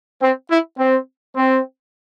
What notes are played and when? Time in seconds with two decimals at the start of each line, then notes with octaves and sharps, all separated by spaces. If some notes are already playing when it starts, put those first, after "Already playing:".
0.22 C4
0.50 E4
0.78 C4
1.35 C4